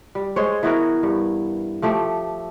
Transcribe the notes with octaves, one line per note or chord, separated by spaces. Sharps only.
G3
G#3 C5 C#5
E3 B3 F#4 A#4
G2
F3 A3 G4